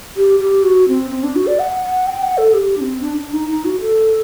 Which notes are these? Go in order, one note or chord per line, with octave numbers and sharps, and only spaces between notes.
G4
G4
F#4
C4
C4
D4
F#4
D5
F#5
F#5
G5
F#5
A4
G4
D4
C4
D4
D4
D#4
D#4
F#4
A4